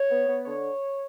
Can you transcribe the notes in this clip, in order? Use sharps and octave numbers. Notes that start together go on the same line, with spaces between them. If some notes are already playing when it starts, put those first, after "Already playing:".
Already playing: C#5
B3
B3
D3 C#5